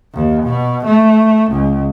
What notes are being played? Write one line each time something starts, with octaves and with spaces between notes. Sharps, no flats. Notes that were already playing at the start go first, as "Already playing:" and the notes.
D#2
B2
A3
C#2